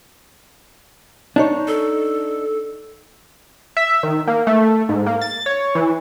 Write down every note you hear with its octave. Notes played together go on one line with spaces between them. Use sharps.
D4 D#4 C#5
A4
E5
D#3
A#3
A3
G#2
A#3
A6
C#5
E3